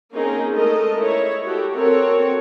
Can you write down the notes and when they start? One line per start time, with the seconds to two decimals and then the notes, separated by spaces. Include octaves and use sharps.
0.13 A#3 C4 C#4 D#4 G#4 A#4
0.55 G#3 A3 A4 A#4 D#5
0.98 E4 C#5
1.45 F#4 G4 A4
1.76 C4 F#4 A4 A#4 C#5